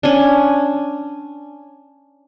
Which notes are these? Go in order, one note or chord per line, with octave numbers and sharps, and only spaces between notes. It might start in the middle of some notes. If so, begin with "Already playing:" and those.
C#4 D4